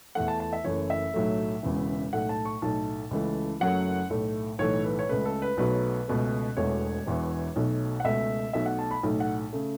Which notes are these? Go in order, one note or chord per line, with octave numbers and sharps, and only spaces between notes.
E2 E3 A3 F#5
A5
A5
E5
F#1 F#2 E3 A3 C#5
E5
B1 A2 F#3 A3
E1 E2 C#3 E3
B1 A2 A3 F#5
A5
C#6
B1 A2 A3 A5
C#2 C#3 E3 A3
F#1 F#2 F#3 A3 F#5
B1 A2 A3
B1 A2 E3 A3 C#5
B4
C#5
C#2 C#3 A3 B4
A4
B4
B1 B2 F#3 A3 B4
C#2 B2 A3
E1 E2 B2 A3 C#5
E1 E2 E3
B1 B2 A3
F#5
C#2 B2 A3 E5
B1 B2 A3 E5
F#5
A5
B5
B1 A2 A3
F#5
C#3 A3